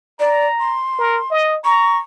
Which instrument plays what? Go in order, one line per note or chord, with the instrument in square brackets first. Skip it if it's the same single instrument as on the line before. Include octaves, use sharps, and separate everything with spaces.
[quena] D5 [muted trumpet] A#5
[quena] C6
[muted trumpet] A#4
D#5
[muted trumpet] A#5 [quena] C#6